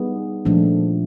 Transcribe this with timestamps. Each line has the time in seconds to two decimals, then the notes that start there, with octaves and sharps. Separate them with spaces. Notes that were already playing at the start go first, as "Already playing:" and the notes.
Already playing: G3 B3 D#4 G#4
0.45 A#2 F3 A3 D4